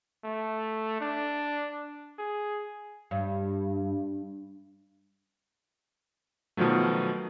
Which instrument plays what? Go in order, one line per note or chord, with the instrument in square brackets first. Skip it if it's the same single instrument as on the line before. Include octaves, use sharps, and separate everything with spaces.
[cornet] A3
D4
G#4
[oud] G2
[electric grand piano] B2 D#3 F3 F#3 A3